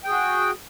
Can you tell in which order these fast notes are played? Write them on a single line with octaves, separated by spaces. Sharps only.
G5 G#4 F#4